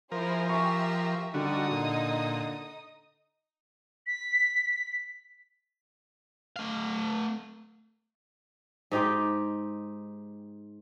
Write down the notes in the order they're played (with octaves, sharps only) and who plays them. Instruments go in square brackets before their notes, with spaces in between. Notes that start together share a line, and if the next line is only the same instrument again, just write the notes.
[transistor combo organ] F3 A#4 [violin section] E4 G#4 C5
[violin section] G4 E5 [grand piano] G#5 C#6
[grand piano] D3 [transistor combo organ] G3 F#4 [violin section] D#4 D#5 D#6
[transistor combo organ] A#2
[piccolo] B6
[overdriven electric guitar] A3 F5
[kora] G#2 D#4 G4 G5